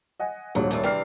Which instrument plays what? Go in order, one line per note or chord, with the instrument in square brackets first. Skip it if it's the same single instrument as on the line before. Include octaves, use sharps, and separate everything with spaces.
[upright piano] D#5 F#5 G#5
[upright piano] D#1 A#1 G#2 [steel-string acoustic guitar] D#2 F#3
[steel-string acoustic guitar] F#2 A2 A3
[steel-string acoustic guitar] C3 E3 D4 [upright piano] G5 F6 C7